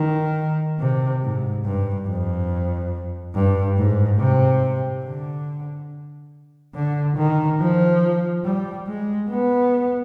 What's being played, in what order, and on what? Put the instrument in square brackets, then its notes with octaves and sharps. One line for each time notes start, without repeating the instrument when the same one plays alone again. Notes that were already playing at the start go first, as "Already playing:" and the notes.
Already playing: [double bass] D#3
C3
G#2
G2
F2
G2
G#2
C3
D3
D3
D#3
F3
G3
G#3
B3